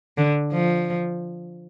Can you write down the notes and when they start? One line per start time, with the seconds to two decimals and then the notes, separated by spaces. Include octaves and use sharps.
0.18 D3
0.53 F3